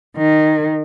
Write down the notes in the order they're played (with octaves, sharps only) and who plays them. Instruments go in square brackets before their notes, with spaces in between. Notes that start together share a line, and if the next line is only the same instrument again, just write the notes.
[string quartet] D#3